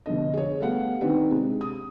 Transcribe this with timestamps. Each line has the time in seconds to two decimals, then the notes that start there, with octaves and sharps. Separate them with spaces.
0.06 F1 B2 D3 D#5
0.34 G#4 C#5
0.60 G3 A3 B3 F5 F#5
1.01 D#3 C4 D4 D#4 G4 B4
1.31 C3 G#3
1.61 D#6